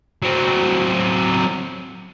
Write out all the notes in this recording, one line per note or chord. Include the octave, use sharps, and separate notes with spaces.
F#3 C4